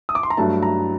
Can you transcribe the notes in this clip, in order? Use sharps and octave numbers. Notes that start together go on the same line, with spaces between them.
D#6
D6
C6
A#5
G2 F#3 A3 A5
A#5